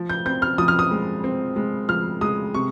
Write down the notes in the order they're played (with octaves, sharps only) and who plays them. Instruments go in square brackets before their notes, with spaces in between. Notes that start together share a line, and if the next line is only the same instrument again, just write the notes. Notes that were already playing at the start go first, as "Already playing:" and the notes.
Already playing: [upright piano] F3
G6
C4 G6
F6
F3 D#6
F6
D#6
G#3
C4
G#3
F3 F6
G#3 D#6
C3 C#6